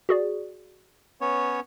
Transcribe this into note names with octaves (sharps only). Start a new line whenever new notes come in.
F#4 G#4 D5
B3 C#4 C#5